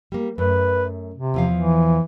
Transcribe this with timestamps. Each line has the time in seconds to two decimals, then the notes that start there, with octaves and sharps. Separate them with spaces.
0.12 G3 A#3
0.38 F#2 A3 B4
1.14 C3
1.34 E2 F3 F5
1.53 E3